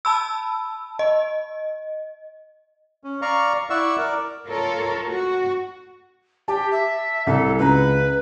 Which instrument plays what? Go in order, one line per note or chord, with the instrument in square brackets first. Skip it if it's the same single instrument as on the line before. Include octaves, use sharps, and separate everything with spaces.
[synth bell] A5 B5 E6
D#5
[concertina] C#4
D5 F5 A#5 C#6
E4 D5 E5 F#5 C#6 E6
A#4 D5
[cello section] F4 A4 A#4 C#5
F#4
[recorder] G4 [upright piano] A5
[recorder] E5
[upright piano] C2 [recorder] A4
[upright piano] C#2 A#5 [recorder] B4